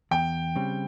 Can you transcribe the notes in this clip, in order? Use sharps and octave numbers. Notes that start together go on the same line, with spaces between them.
E2 G5
C#3 G3 C4